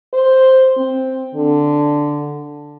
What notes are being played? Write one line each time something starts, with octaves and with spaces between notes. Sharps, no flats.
C5
C4
D3